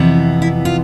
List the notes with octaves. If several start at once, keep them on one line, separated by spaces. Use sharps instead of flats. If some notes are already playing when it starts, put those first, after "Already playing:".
Already playing: F2 C3 E3 B3
E4
F4